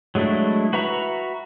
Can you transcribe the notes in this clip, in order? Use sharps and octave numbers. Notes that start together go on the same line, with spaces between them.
F#3 G#3 A3 D4 E4
F#4 B4 E5 A#5 C#6